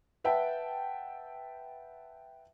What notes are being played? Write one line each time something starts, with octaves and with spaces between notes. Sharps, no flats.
B4 E5 F#5 G5 A5